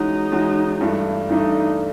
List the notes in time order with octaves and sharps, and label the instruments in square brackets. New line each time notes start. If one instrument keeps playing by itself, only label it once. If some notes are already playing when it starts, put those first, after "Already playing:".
Already playing: [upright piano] E3 G#3 C#4 F#4 [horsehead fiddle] D#4
[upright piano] E3 G#3 C#4 F#4
G2 E3 A3 D4
[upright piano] G2 E3 A3 D4 [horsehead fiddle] D#4